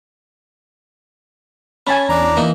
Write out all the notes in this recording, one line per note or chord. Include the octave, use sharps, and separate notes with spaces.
C#4 G#5 A5 B5
E2 D4 A#5
E3 A#3 D#4